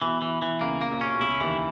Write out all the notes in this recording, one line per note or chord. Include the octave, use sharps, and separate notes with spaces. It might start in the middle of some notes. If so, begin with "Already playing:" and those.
B1 B2 E3
E3
E3
C#2 C#3 A#3
A#3
A#1 A#2
C#4
B2
C#2 C#3 E4
D#2 D#3 E3